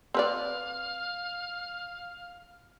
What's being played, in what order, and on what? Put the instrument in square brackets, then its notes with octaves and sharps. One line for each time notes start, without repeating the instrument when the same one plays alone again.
[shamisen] C4 B4 D5 [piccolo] F5